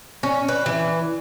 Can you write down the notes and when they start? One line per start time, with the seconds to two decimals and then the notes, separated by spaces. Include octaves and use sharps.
0.23 C#4
0.48 B4
0.66 E3